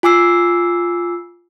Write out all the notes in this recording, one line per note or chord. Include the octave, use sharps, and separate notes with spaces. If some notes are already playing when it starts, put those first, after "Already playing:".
F4 G#5 D6 E6 C7